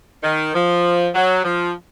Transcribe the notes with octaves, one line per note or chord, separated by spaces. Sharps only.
D#3
F3
F#3
F3